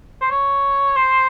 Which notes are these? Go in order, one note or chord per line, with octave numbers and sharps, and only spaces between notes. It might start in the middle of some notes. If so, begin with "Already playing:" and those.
C5
C#5
C5